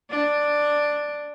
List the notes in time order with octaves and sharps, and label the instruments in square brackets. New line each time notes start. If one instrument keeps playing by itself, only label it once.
[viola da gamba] D4